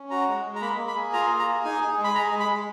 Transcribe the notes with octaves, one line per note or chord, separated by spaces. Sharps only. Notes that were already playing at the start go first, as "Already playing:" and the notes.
Already playing: C#4
F#4 A#5
G#3
G#3
A#5
A#3 B5
A#3
B5
G#4
F4 A#5
A#3
A#5
G#4
D#4 G#5
G#4
G#3
B5
G#4 A#5
G#3
B5
G#3